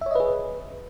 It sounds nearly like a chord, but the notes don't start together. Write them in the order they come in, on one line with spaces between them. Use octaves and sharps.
E5 C#5 D#5 B4 G#4